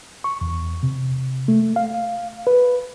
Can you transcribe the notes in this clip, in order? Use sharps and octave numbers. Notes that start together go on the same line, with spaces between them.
C#6
E2
C3
A3
F5
B4